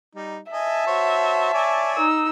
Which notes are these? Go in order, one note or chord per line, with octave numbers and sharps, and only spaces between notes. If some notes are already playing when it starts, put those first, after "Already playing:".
G3 D#4
D#5 E5 G#5 A5
F#4 C5 C#5
C#5 D5 G#5
D#4 E6